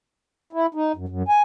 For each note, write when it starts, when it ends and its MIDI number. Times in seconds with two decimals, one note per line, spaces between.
0.53 0.66 64
0.75 0.92 63
0.96 1.06 42
1.08 1.23 42
1.29 1.42 80